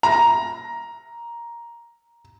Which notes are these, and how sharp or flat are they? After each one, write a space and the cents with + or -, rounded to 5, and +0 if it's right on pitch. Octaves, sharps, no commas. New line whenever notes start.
A#5 +5